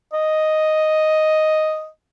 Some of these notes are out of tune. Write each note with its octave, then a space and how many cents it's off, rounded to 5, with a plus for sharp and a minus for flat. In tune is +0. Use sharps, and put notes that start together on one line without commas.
D#5 +0